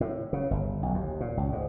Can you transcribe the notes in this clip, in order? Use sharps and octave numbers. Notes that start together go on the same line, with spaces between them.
A2
C#3
G1
B1
D#2
A#2
C#2
G#2